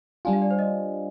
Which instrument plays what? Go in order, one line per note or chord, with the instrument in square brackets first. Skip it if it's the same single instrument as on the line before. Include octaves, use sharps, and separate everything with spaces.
[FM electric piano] G3 D4 F4 [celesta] G#5
[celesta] F5
D5
C5
D#5